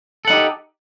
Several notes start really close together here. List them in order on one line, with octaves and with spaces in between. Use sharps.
A4 F#5 D#4 G4